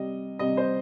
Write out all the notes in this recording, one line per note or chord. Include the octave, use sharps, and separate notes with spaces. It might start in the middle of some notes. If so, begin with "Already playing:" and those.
Already playing: C3 G3 D#5
C3 G3 D#5
C5